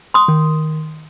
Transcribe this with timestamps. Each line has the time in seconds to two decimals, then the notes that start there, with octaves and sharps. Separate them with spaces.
0.14 C6 D#6
0.28 D#3